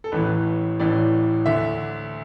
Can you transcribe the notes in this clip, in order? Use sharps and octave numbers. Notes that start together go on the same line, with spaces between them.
A4
A1 A2 E3 B4
A1 A2 E3 D5
D2 D3 E5